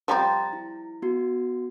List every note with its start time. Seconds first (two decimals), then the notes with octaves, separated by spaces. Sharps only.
0.08 F3 G3 C4 A#5 A6
0.53 E4
1.02 B3 F#4